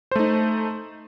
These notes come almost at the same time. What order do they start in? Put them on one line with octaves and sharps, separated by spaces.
C5 A3 D#4